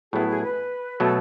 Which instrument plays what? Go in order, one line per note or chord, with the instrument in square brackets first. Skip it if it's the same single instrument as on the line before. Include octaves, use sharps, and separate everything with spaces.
[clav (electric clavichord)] A2 F#3 B3 E4 [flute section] G#4
[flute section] G#4
B4
[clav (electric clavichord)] B2 F#3 A3 [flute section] A4